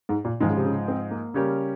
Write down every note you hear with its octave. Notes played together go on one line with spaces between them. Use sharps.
G#2
A#2
G#2 D#3 F3 G#3
C#3
C3
C#3
C4
A#3
C#3 G3 C#4 G4 A#4